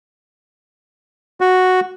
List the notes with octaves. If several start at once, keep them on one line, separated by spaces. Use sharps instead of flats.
F#4